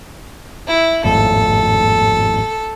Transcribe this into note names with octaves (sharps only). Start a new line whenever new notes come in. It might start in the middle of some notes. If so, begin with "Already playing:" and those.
E4
G#1 F2 A2 A4